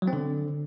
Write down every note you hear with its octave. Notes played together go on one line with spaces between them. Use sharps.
F#3
C4
D3